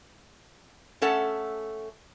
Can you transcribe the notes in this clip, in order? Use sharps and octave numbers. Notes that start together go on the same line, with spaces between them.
A3 C#4 A4 F#5